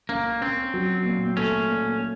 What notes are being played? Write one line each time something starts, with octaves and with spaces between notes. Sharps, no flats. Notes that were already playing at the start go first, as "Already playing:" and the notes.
A#3 C#4
C4 C#4
F#3
A#2
A3 C#4
A#2
A3